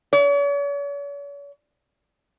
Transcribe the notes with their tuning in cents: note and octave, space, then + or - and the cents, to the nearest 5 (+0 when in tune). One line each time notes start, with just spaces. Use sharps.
C#5 +45